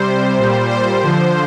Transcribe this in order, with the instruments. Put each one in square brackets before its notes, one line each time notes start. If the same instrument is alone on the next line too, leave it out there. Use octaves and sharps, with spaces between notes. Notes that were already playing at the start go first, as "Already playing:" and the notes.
Already playing: [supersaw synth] C3 G3 C5
A#2 G3
C5
D3 F3